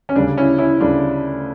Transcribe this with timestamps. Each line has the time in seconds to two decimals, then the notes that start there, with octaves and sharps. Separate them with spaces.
0.09 C#4
0.16 D2 C#3 G3 D4
0.37 C#4 E4
0.58 C#4 E4
0.80 D2 C#3 G3 D4